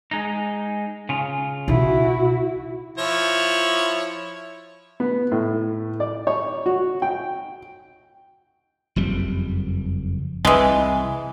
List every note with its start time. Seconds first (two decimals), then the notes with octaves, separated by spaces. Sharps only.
0.11 G#3 D#4
1.09 C#3 F4
1.68 B2 D#4 E4 F#4
2.98 F3 E4 C#5
5.00 B3
5.32 A2
6.00 D5
6.27 C#5
6.66 F#4
7.02 G5
8.96 F#1 F2 G3
10.45 C2 E3 G#3